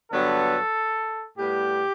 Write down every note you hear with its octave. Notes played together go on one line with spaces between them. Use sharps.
G2 D3 F#3 B3 A4
A2 G3 B3 G4